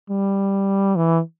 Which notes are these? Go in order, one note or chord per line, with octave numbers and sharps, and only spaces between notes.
G3
E3